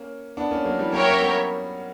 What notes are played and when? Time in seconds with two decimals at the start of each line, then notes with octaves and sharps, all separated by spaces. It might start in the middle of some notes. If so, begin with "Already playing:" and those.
Already playing: A#3 C#4
0.37 B3 D4
0.51 A#3 C#4
0.65 F#3 A#3
0.78 E3 G3
0.92 F#3 A#3 G4 A#4 C#5 E5 G5
1.09 C#4
1.20 G3 B3